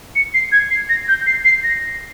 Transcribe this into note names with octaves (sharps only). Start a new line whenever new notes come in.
C#7
C7
G#6
C7
A#6
G6
C7
C7
A#6